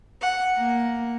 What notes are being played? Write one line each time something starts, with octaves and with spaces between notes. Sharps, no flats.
F#5
A#3